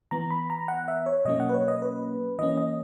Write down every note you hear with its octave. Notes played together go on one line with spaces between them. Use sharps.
E3 B3 A#5
B5
A#5
F#5
E5
C#5
B2 F#3 A#3 C#4 D#5
F#5
B4
C#5
D#5
B4
E3 A#3 C#4 D#5
D#5